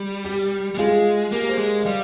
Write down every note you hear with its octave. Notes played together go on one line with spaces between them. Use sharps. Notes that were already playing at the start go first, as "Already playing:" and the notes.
Already playing: G3 G4
G4
G3
G#3 F4 G#4
A#3 G4 A#4
G#4 C5
G#3
D#5
G3 D5 F5